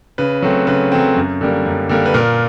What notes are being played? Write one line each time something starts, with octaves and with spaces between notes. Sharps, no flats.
C#3 B4
F#3 A3 C4
C#3 B4
F#3 A3 C4
F#2
D3 G3 A#3
F#2
D3 G3 A#3
B4
A#2 A#4